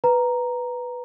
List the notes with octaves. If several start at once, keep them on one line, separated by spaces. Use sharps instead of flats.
B4 A#5